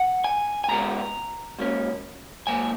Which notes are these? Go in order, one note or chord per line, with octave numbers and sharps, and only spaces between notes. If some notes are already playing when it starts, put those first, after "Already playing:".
Already playing: F#5
G#5
G#5
C#2 B2 G#3 B3 A#5
G#2 F#3 A#3 C#4
G#2 F#3 A#3 G#5